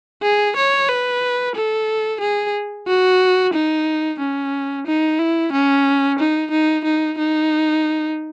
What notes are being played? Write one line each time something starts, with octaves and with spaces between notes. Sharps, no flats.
G#4
C#5
B4
A4
G#4
F#4
D#4
C#4
D#4
E4
C#4
D#4
D#4
D#4
D#4